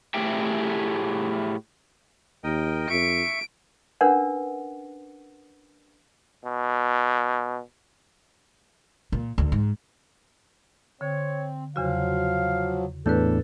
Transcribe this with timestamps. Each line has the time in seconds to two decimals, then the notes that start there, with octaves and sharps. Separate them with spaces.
0.14 A2 A3 G4 G#4 E5 G5
2.44 D#2 A#4 D#5 G5
2.90 F2 E5 C#6 D7
4.01 C#4 D4 A#4 B4 F#5
6.45 B2
9.12 A#2
9.38 D2
9.52 G#2
11.01 D3 C4 C#5
11.76 E2 C#3 F3 F#3 F#4 F5
13.06 E2 A2 D4 A4 B4 F#6 G6